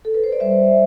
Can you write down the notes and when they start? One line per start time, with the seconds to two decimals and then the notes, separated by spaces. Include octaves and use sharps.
0.05 A4
0.14 B4
0.24 C5
0.32 D5
0.40 G3 C5 E5
0.59 G3